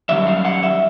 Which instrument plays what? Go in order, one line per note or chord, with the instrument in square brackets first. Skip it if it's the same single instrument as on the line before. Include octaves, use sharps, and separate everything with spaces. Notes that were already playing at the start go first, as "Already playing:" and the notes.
[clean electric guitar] F#2 D#3 G3 E5
F5
F#5
E5